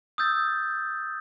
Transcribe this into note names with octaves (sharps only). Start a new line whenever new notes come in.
D#6 E6 G6 A6